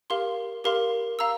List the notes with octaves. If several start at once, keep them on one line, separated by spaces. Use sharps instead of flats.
G4 A#4 F5 C6
G4 A#4 F5 C6
F5 A#5 E6